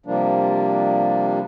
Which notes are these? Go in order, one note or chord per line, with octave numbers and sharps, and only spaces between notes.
C3 F3 G3 A#3 D4